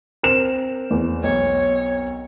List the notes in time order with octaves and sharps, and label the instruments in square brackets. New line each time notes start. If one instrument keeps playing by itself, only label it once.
[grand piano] C4 A#4 E7
[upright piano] E2
[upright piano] B1 [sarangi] C#5